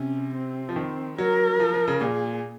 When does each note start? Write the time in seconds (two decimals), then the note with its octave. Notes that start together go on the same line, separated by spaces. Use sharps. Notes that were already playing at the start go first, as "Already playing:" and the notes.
Already playing: C3 C#4
0.35 C4
0.69 F3
0.76 D#3
1.18 F#3 A#4
1.60 F3
1.74 F3
1.88 C#3
2.01 A#2 G#4